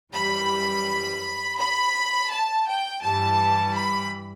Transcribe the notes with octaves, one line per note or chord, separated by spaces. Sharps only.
F#2 E3 G3 B5
B5
A5
G5
G2 E3 G3 A5
B5